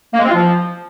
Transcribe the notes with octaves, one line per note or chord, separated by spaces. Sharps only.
A#3
G#3
C4
F4
F3